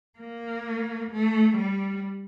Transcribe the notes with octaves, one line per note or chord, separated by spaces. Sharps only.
A#3
A3
G3